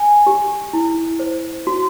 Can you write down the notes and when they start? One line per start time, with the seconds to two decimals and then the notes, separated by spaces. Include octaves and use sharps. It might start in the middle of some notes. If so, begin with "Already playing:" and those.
Already playing: G#5
0.27 G4
0.73 E4
1.19 C5
1.67 F#4